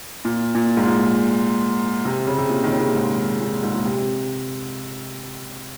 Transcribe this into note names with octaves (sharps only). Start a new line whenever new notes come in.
A#2
A#2
G#2
A#2
C3
C#3
C3
A#2
D#3
C#3
C3
A#2
G#2
A#2
G#2
A#2
C3